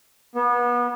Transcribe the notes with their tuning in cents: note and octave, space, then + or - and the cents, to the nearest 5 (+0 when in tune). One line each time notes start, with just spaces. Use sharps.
B3 -30